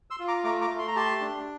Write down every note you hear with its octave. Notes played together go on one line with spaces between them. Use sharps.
C6 E6
F4
A#5 D6
A3 A#5 D6
A#5 D6
A3
C6
A#5
G4 A5 C6
D4